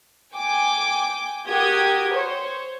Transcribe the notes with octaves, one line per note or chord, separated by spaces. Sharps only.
G5 G#5 D6
F#4 G4 A#4 D#6 G#6
C5 C#5